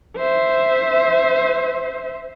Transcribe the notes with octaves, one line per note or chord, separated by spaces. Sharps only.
C5 E5